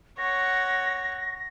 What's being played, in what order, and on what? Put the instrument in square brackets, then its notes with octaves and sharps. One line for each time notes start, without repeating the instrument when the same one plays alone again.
[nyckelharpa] C#5 F#5 [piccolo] A#6